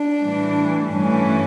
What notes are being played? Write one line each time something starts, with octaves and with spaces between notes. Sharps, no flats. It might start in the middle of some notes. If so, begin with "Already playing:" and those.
Already playing: D4
A2 E3 G3
G2 E3 A3 C#4